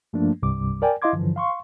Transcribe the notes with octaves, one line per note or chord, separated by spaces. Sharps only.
G2 F3 A3 A#3 D4
C2 G2 C3 G3 D6
A#4 D5 G5 G#5
E4 D#5 F5 C6 D6 G#6
G2 D3 E3 F3
F5 C6 C#6